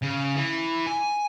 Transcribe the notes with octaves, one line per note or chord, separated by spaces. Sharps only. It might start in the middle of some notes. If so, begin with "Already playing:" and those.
C#3
E3
G#5